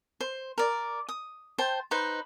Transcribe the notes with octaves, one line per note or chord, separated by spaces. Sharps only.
C5
A#4 D5
D#6
C5 G5 A5
D#4 B4 C5